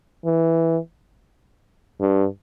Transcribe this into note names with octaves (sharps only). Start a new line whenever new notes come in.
E3
G2